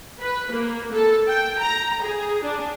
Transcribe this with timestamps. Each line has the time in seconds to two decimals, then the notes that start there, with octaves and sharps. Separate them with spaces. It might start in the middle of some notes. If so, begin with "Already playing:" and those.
0.21 B4
0.51 A#3
0.93 A4
1.29 G5
1.60 A#5
2.03 G#4
2.44 D4